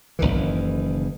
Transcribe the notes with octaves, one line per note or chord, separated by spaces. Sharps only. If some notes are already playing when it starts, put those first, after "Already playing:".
F#1 B1 D#3 E3